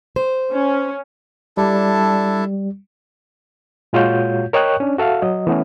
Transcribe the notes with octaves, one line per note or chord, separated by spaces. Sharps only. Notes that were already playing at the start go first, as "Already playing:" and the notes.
C5
C#4
G3 D4 E4 A4
A#2 G#3 F4 F#4 C#5 G6
A#4 C#5 D#5 G5 C#6 F#6
C#4 D4
F#4 A4 E5 F5
F#3 D#5
E3 A3 B3 C#4